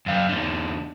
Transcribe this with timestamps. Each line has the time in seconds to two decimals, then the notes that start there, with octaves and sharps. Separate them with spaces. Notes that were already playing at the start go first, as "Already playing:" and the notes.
0.06 F#2 F5
0.29 E2 D3